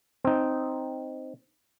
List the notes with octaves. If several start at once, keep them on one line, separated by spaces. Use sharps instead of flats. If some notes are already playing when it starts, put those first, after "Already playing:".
C4 D#4